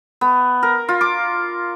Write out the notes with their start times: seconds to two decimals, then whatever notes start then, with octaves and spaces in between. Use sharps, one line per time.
0.21 B3
0.63 A#4
0.89 F4
1.01 D6